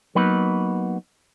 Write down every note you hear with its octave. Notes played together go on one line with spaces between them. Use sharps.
F#3 A#3 B3 D#4 B4